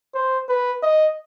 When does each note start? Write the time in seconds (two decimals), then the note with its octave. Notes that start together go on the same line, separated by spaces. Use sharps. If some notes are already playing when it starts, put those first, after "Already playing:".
0.14 C5
0.49 B4
0.83 D#5